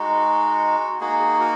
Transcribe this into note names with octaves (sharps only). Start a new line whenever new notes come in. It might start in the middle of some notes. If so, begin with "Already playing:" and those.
Already playing: G#3 D#4 F#4
A#3 D#4 F#4 G#4
G#4
F#4 A#4